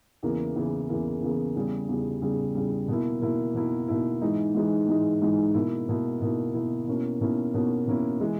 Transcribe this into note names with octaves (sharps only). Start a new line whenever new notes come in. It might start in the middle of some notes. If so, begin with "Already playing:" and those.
E2 C#3 E3 A#3
E2 C#3 E3 A#3
E2 C#3 E3 A#3
E2 C#3 E3 A#3
E2 C#3 G3
E2 C#3 G3
E2 C#3 G3
E2 C#3 G3
B2 A#3 E4
B2 A#3 E4
B2 A#3 E4
B2 A#3 E4
G#2 E3 G#3 D#4
G#2 E3 G#3 D#4
G#2 E3 G#3 D#4
G#2 E3 G#3 D#4
B2 A#3 E4
B2 A#3 E4
B2 A#3 E4
B2 A#3 E4
B2 A#3 C#4 E4
B2 A#3 C#4 E4
B2 A#3 C#4 E4
B2 A#3 C#4 E4
E3 G#3